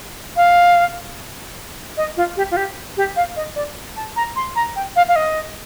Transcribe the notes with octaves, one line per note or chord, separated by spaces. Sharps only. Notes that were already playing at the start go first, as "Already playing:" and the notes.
F5
D#5
F4
G4
F4
G4
G4
F5
D#5
D5
A5
A#5
C6
A#5
G5
F5
F5
D#5